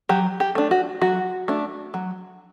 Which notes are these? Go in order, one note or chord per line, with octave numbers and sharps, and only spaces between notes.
F#3 G4
G4
A3 D4
F#4
F#3 F#4
A3 D4
F#3